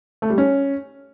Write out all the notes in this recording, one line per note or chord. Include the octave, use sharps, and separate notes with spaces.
A3
G3
C#4